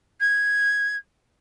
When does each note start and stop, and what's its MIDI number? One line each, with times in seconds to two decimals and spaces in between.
0.20 0.96 92